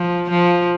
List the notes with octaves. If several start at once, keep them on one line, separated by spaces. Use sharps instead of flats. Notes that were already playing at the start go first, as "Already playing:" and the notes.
Already playing: F3
F3